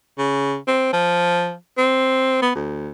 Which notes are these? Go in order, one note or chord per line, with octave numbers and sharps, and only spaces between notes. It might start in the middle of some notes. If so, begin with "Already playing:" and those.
C#3
C4
F3
C4
B3
D2